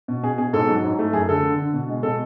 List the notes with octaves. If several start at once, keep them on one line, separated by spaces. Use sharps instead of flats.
B2
B2 G#4
B2 G#4
G#2 A4
F#3
G#2
A3
F#2 G#4
D3 A4
D3
D3
B2
G#3
B2 A4